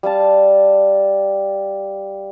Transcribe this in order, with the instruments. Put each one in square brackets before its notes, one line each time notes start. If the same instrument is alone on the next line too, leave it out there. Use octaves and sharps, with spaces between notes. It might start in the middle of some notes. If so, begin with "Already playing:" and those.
[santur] G3 F5 A5